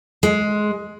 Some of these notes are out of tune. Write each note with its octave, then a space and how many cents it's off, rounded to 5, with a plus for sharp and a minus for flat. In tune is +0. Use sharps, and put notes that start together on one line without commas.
G#3 +15